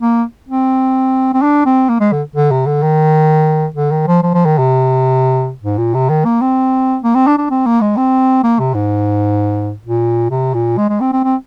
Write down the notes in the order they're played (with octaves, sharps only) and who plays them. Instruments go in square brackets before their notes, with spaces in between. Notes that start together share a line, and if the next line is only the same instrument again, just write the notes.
[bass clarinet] A#3
C4
C4
D4
C4
A#3
G#3
D3
D3
C3
D3
D#3
D3
D#3
F3
F3
F3
D#3
C3
G#2
A#2
C3
D#3
A#3
C4
A#3
C4
D4
D4
C4
A#3
G#3
C4
A#3
C3
G#2
A#2
C3
A#2
G#3
G#3
C4
C4
C4